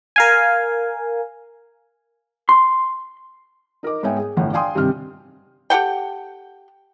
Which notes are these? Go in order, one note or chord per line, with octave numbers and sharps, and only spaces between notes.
A#4 F5 G#5
C6
D#4 A#4 D#5 D6
G#2 B3 C#5 E5 G5 G#5
G#4
G1 A2 E3 F#5 G5
D5 F5 G5 G#5 C6 D#6
G2 C3 D#3 C4 F6
G4 A4 F#5 G5